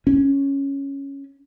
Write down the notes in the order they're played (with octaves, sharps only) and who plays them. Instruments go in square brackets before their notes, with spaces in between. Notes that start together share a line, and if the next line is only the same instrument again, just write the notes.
[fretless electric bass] C#4